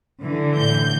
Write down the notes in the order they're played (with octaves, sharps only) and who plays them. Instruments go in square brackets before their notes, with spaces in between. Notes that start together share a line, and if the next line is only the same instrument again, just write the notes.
[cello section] D3 E3
[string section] A2 G6